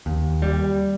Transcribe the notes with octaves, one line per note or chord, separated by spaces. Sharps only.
D#2
G3